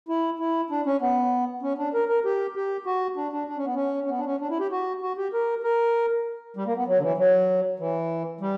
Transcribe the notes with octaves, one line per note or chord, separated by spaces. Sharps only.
E4
E4
D4
C#4
B3
C#4
D4
A#4
A#4
G4
G4
F#4
D4
D4
D4
C#4
B3
C#4
C#4
B3
D4
C#4
D4
E4
G4
F#4
F#4
G4
A#4
A#4
G3
A#3
B3
F#3
D3
E3
F#3
E3
G3